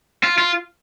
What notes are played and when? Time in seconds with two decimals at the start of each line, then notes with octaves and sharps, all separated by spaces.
0.23 F4
0.38 F4